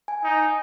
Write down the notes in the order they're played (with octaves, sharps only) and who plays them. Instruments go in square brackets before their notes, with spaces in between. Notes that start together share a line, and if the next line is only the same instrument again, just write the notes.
[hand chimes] G#5
[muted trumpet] D#4